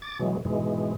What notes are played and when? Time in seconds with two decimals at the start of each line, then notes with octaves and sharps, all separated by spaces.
0.02 D6 A6
0.19 B2 E3 F#3 G#3
0.45 G#2 B2 E3 G#3